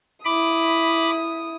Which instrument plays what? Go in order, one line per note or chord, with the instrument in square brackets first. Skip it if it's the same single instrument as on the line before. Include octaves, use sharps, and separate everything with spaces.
[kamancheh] E4 D#6 [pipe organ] B5 D6